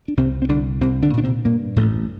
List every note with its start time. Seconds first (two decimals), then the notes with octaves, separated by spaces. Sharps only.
0.08 D4
0.17 C2 C3 C4
0.42 C4
0.49 C2 D3 D4
0.81 C2 C3 C4
1.02 D3 D4
1.13 A#2 D4
1.24 C3 C4
1.45 G2 A#2 A#3
1.76 A1 A2 A3